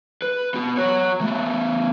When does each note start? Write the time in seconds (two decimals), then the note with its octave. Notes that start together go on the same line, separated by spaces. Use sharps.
0.22 B4
0.54 B3 F#4
0.77 F#4 C#5
1.21 A3 B3